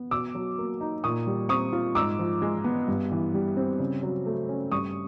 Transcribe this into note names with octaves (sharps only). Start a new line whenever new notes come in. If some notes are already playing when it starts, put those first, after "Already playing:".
Already playing: B3
B2 D6 E6
F#3
A#3
D#4
A#2 C#6 D#6
G3
C4 C#6 D#6
F4
G#2 D6 E6
F3
G#3
B3
G2
E3
G3
C4
C#3
F#3
A3
C#4
G2 C#6 D#6